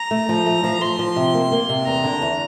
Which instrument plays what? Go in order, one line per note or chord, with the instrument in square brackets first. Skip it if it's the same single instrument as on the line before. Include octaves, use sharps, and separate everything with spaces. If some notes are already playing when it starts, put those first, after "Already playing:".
Already playing: [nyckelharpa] A#5
[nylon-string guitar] A3
F3
A3
F3
[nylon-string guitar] F3 [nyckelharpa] C6
[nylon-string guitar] F3
C3
A#3
A#3
C3
[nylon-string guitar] E2 [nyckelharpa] A#5
[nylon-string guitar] D3
E2